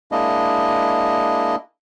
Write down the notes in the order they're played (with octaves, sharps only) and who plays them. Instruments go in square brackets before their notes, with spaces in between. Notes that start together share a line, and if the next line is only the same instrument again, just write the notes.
[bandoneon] G#3 A#3 D4 E4 D#5